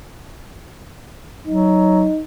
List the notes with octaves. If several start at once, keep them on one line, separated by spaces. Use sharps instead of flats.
F#3 D#4